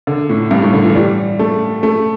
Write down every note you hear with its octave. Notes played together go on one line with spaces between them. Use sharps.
D3
A2
G2
A2
D3
E3
G3
A3
A3